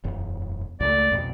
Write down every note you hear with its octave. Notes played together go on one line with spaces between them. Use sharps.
E1 F#2
C#2 F#3 A3 D5
B1 F2 B2